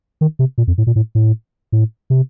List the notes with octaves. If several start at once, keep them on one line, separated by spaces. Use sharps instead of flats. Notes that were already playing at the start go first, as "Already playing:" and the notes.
D#3
C3
A#2
F2
A2
A#2
A2
A2
A2
C3